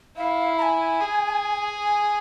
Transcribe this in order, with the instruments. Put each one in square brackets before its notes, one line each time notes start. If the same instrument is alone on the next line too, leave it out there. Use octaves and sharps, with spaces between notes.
[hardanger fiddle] E4 [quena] F5
[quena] A#5
G#5
[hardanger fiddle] G#4
[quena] G#5